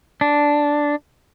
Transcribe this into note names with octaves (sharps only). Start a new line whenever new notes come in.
D4